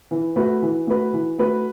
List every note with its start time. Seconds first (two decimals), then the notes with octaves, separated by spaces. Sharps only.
0.11 E3
0.36 A3 F#4 B4
0.62 E3
0.87 A3 F#4 B4
1.13 E3
1.39 A3 F#4 B4